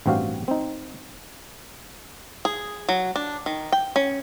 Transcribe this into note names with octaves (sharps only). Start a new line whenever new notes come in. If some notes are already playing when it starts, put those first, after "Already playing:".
A1 G2 C4 F#4 G4 F5
C4 D#4
G#4
F#3
D4
D#3
G5
C#4